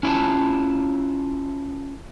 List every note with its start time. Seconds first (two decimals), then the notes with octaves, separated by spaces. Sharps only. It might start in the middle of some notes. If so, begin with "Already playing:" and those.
0.03 C#4 E4 F4 A5